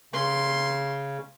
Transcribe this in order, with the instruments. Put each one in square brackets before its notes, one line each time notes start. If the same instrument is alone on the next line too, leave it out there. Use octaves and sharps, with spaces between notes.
[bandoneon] C#3 [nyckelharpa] C6